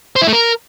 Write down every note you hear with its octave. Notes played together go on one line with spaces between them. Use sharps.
C5
E4
A3
A#4